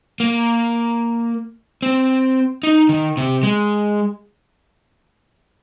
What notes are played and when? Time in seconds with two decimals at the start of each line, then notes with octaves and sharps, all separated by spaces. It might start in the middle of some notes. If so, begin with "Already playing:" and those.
0.20 A#3
1.82 C4
2.63 D#4
2.89 D#3
3.17 C3
3.43 G#3